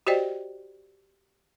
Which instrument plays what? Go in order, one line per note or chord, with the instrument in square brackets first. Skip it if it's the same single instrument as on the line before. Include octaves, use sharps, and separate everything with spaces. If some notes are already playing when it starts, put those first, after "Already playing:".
[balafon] F#4 G4 C5 D5 D#5 G5